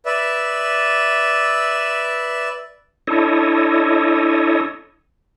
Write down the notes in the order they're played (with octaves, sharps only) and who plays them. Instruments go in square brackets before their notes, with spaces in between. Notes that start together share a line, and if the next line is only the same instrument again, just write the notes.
[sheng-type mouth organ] B4 D5 E5
[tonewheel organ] D4 E4 A4 C#5 D#5